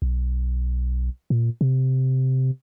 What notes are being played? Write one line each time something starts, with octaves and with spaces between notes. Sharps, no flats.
B1
A#2
C3